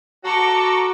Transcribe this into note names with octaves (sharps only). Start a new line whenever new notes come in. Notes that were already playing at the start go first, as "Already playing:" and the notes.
F#4 A4 A#5 C#6 D6